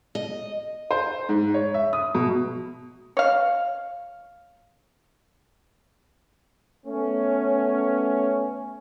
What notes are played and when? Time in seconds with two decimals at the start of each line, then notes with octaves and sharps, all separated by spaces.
0.15 D#5
0.91 C5
1.29 G#2
1.54 C#5
1.74 E5
1.93 D#6
2.15 B2
3.17 C#5 F5
6.86 A3 B3 C#4